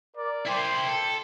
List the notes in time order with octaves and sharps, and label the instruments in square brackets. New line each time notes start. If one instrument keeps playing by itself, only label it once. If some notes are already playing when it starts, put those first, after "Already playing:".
[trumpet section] A#4 D5
[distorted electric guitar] E4 C5 [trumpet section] G5 C6
[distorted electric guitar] A4